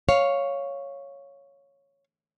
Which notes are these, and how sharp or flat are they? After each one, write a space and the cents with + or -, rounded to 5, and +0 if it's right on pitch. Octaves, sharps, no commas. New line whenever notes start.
C#5 +0 F5 +0